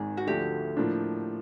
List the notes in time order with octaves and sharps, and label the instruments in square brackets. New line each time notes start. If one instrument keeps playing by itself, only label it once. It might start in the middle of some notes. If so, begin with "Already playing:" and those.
Already playing: [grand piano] G#1 G#2 D#3 [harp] G#4
[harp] F#4
[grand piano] D2 D3 F3 A3 [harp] G4
[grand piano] A2 F3 A#3 D4